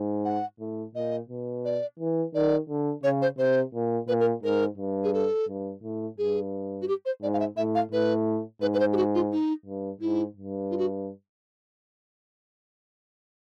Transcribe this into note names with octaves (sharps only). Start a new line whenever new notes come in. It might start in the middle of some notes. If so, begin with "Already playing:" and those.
Already playing: G#2
F#5
A2
A#2 D#5
B2
D5
E3
D#3 D5
D3
C#3 C#5
C5
C3 C5
A#2
A#2 B4
A#4
G#2 A#4
G2
G#4
A4
G2
A2
G2 G#4
F#4
G4
C5
G#2 D5
F5
E5
A2 E5
F5
A2 B4
G#2 B4
B4
C5
G4
F#4
F4
D#4
G2
G#2 E4
G2
F4
F#4